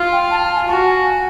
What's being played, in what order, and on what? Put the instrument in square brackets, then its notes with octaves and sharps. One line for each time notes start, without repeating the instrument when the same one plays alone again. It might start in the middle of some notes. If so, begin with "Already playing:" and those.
Already playing: [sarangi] F4
[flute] G5
A5
A5
G#5
[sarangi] F#4 [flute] A5
[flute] G#5
G#5